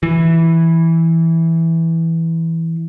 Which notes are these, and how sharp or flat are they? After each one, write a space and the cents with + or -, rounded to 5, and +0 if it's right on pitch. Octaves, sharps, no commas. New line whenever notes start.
E3 -5